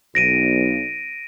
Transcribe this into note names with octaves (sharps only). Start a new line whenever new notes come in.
B1 A#6 D7 D#7